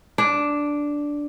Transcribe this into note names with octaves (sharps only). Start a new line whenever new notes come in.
D4